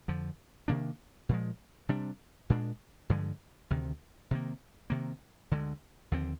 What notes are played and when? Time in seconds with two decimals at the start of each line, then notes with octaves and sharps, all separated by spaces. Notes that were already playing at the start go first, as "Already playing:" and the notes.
0.08 F2 D3 F3
0.68 C3 D#3 A#3 D4
1.29 A#2 F3 G#3
1.89 C3 G3 D4
2.50 A#2 G#3 D4
3.09 G2 D3 F3 G#3
3.70 D2 C3 D#3
4.31 C3 D#3 A#3
4.90 C3 D#3 A#3
5.52 D2 D3 G#3
6.12 D#2 D3 F3 C4